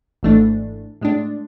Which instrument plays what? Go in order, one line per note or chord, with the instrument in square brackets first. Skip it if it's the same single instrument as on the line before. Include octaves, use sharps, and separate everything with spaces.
[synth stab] G#1 G#2 E3 A3 D4
A2 G#3 D4